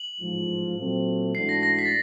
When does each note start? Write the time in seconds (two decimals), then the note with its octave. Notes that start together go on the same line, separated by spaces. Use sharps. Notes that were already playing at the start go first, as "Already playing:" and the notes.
Already playing: F#7
0.19 A1 G#2 F3
0.77 A#2 F#3 A3 C4
1.34 G#2 E3 A3 D4 F#4 C7
1.49 A#6
1.63 A#6
1.79 B6
1.85 A6